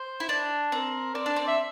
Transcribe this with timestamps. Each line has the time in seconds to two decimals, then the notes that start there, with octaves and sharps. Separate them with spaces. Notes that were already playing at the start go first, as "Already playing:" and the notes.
Already playing: C5
0.20 E4
0.29 D4
0.71 C4 A#4
1.15 C4 D5
1.26 D4
1.36 C4
1.48 E5